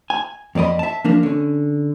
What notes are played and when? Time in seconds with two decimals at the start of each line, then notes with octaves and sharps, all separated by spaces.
0.10 G#5
0.55 F2 A#3 D5 D#5 B5
0.79 E5 A5
1.04 F3 A#3 D4 A#4
1.23 D3 C#4